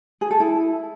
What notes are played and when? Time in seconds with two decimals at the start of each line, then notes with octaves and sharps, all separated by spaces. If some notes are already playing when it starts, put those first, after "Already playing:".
0.21 G#4
0.31 A4
0.40 E4